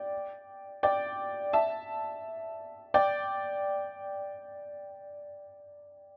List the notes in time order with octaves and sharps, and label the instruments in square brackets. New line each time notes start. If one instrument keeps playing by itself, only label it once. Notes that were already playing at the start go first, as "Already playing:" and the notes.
Already playing: [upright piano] D5 G5
D5 G5
E5 A5
D5 G5